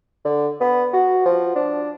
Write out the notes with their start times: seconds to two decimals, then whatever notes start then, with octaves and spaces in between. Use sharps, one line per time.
0.25 D3
0.60 B3
0.93 F#4
1.25 F3
1.56 D4